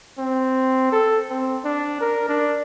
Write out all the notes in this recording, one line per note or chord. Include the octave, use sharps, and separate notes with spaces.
C4
A4
C4
D4
A#4
D4